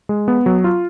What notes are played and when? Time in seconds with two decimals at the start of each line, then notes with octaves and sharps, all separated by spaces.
0.09 G#3
0.28 B3
0.46 F#3
0.64 F4